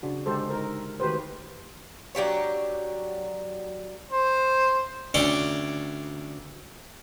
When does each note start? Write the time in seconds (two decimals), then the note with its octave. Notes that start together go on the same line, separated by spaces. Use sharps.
0.03 C#3 D4 F#4
0.26 D3 G#3 G4 A4 C5
0.49 D#4 A#4 C5
1.00 D#3 A3 F#4 G4 B4 C5
2.15 F#3 D4 G4 C#5
4.10 C5
5.14 D2 C#4 D4 C#5 G5